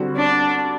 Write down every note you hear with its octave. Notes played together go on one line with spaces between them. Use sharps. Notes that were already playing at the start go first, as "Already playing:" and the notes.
Already playing: D3 G3 C4 F#4
D4